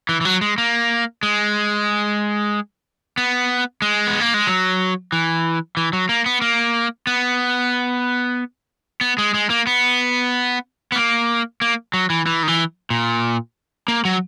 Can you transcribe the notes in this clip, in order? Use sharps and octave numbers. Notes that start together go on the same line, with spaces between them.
E3
E3
F#3
G#3
A#3
G#3
B3
G#3
B3
A#3
G#3
F#3
E3
E3
F#3
A#3
B3
A#3
B3
B3
G#3
G#3
A#3
B3
B3
A#3
A#3
F#3
E3
E3
D#3
E3
A#2
A#3
F#3